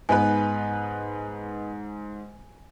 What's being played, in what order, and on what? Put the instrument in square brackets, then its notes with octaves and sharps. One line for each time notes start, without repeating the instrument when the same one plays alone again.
[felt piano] G#2 [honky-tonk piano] B3 D#4 B4 [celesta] G#5